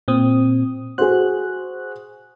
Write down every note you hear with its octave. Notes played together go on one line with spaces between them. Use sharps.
A#2 C4 D#6
F#4 G#4 C5 F#6